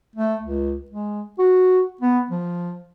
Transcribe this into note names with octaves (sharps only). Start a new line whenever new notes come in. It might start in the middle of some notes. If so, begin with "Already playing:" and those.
A3
C#2
G#3
F#4
B3
F3